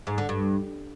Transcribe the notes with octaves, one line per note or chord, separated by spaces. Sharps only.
G#2
D3
G2